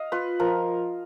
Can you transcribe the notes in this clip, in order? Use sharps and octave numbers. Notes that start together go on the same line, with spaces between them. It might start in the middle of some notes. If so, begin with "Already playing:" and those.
Already playing: D#5 F5
F4 B4
F3 A#4